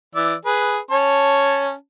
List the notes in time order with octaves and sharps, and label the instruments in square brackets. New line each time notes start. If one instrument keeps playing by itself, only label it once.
[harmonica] E3 D5 E6
G#4 B4
C#4 C#5 A5